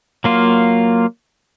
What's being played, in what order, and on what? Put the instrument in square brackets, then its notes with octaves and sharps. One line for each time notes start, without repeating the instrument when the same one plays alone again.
[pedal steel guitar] F#3 A#3 F4